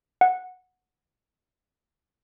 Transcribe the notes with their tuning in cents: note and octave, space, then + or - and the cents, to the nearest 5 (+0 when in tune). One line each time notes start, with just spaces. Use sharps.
F#5 -10